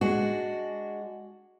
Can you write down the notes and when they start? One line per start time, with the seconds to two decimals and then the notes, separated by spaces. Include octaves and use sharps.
0.01 G#3 D4 F#4